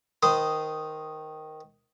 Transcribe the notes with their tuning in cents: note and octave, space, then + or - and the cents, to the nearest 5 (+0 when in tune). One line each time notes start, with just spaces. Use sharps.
D#3 +0 C5 -20 D#6 +0